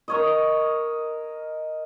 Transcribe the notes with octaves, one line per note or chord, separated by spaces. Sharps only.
A#4 C#5 D#5